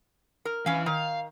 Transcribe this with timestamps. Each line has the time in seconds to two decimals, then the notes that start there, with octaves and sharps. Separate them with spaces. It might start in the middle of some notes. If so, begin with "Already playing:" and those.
0.45 A#4
0.66 E3 C#4 F5
0.86 D#3 F5